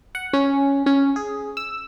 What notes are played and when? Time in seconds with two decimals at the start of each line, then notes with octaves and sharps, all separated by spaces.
0.15 F#5
0.33 C#4
0.86 C#4
1.16 G#4
1.57 E6